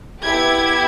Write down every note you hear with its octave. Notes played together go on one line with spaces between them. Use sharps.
B3 E4 G4 G#6